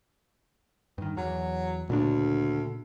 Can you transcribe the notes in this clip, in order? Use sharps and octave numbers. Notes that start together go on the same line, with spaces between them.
G2 D#3
E2 F#3
D2 A#2 C#3 D4